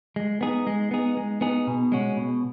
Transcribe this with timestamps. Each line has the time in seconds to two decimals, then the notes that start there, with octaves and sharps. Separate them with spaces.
0.16 G#3
0.41 B3 D#4 G#4
0.67 G#3
0.91 B3 D#4 G#4
1.17 G#3
1.41 B3 D#4 G#4
1.67 B2
1.92 G#3 C#4 F#4
2.17 B2